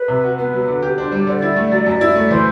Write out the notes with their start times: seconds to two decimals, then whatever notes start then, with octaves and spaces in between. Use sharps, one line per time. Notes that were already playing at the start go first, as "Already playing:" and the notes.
Already playing: B4
0.08 C3
0.24 F#4
0.38 B3 B4
0.53 F#3
0.68 D3
0.82 G4
0.97 D4 C5
1.12 G3
1.20 D5
1.27 D3 C5
1.37 D5
1.42 E4
1.56 A3
1.72 F#3
1.86 F#2 E5
1.91 D5
2.01 E4
2.15 A3 D5
2.30 E3 C5